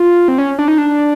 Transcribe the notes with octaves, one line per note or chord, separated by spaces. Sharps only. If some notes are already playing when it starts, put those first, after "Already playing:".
Already playing: F4
C4
C#4
D4
D#4
D4